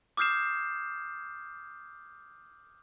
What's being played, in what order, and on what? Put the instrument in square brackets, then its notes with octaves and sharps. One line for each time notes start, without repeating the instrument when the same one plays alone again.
[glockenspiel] D6 D#6 F6 G6 C7 E7